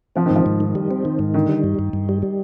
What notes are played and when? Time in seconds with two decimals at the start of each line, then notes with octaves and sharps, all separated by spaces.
0.16 F3 C4
0.26 D#3
0.31 G#2
0.36 F3
0.46 G#2
0.60 D#3
0.75 G3
0.91 C4
1.05 D#3
1.19 G#2
1.34 D3 D#3
1.49 G3
1.64 G2
1.79 G2
1.93 G2
2.09 G3
2.22 G3